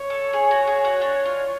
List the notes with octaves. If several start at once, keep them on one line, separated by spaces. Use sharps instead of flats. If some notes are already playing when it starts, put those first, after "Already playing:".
Already playing: C#5
A4
G#4
F#4
G#4
F#4
D4
F4